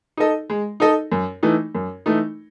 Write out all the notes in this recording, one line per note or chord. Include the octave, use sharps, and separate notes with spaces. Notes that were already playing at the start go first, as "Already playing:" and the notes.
D#4 A4 D#5
G#3
D#4 A4 D#5
F#2
E3 A3 D#4
F#2
E3 A3 D#4